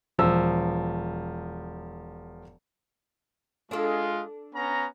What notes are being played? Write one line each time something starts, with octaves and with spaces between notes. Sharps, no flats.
E1 F3 E6
G#3 D4 F4 A4
B3 C#4 A#5